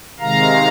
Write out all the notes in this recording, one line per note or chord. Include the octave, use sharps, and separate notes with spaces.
C3 D#3 G#3 F5 A#5